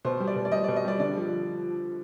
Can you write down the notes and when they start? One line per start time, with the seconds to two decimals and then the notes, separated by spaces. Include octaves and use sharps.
0.05 B2 C5
0.20 G3
0.27 D5
0.36 B2
0.45 D5
0.51 G3 D#5
0.64 D5
0.68 B2
0.76 D#5
0.85 G3 D5
0.99 D3 D5
1.15 F3